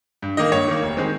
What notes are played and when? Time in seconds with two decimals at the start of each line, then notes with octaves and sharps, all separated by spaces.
0.22 G2
0.37 D#3 A#3 D#5
0.52 G2 C#5
0.68 D#3 A#3
0.83 F1
0.97 D#3 G#3 C4